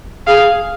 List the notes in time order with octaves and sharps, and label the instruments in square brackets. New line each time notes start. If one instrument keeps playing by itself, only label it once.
[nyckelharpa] G#4 [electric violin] F5